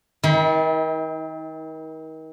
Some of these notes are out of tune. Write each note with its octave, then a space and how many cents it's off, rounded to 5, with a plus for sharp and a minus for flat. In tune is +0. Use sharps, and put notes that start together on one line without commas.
D#3 +35 E4 -40